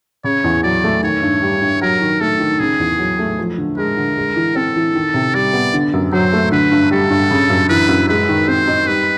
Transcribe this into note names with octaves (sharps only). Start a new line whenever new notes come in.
C#3 C#5
E2
F#3 D5
A3
D#3 C#5
G2
G3
G2
F#3 A#4
D#3
A3 A4
D#3
C#3 G#4
E2
F#3
A3
F3
D3
G#3 A#4
D3
G#3
E3
C4 A4
E3
D#3
C3
G3 D5
B3
D3
F#2
F#3 C5
A3
D3 B4
G2
G3 A4
G2
C#3
F#2
E3 B4
F#2
G#3 B4
D#3
C4 C5
D#4
G3 B4